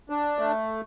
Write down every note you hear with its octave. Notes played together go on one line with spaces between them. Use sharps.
D4
A3